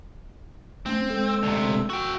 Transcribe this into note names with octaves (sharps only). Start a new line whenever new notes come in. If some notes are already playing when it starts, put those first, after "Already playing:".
A3 C4 C#4
G#3 A4 E6
D2 C3
F#4 G5 E6